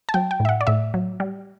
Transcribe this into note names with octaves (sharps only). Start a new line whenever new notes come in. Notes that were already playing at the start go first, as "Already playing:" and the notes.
A5
F#3 G5
G5
A2
E5
F#5
D5
A2 E5
F#3
G3